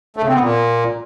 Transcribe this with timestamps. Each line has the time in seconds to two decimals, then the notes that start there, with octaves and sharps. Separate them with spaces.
0.17 A3
0.22 C#3
0.28 C4
0.34 B3
0.40 A#2